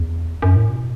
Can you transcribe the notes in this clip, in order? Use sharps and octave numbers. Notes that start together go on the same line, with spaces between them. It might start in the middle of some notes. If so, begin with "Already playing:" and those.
Already playing: E2
F#2
A2
B2